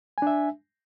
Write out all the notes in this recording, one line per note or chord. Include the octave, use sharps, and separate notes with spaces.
D4 E5 G#5